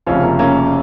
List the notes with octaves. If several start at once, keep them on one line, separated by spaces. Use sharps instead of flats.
F1 F2 C#3 F3 C#4 F4
A#3
A#3 C#4